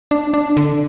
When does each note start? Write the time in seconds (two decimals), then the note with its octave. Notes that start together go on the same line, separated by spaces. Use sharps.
0.11 D4
0.34 D4
0.57 D3